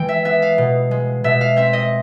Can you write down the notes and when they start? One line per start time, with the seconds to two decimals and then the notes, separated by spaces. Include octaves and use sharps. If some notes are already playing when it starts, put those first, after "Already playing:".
Already playing: E3 G#3 G5
0.09 E5
0.25 B3 E5
0.42 F5
0.58 B2
0.91 G#3
1.24 B2 E5
1.41 F5
1.56 C4 E5
1.73 D#5